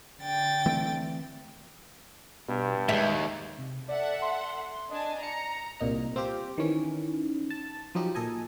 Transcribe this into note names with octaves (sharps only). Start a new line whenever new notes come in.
D3 G5 A6
E3 A3 C4
G2 B2
D#2 G#2 G#3 E5
C3
A4 D5 E5 F#5
C6
D4 D#5 G#5 A5
A#5 C#7
C2 A#2 D#4 A#5
C4 F4 G4
D#3 E3 C#4
A5
F3 F#3 D#4 G4
A#2 A4 D#5 G#5